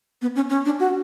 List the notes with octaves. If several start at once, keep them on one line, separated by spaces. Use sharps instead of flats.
B3
C#4
C#4
D4
F#4